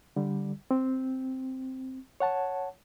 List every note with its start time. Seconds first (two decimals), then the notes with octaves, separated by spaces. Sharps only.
0.16 D3 G3
0.71 C4
2.20 C#5 F#5 A5